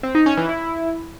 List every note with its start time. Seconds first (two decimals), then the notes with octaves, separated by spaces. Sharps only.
0.03 C4
0.15 D#4
0.26 C#4
0.37 E3
0.49 E4